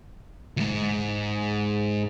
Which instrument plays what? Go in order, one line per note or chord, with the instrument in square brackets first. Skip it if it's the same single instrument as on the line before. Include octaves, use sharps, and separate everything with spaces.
[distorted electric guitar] D2 G#2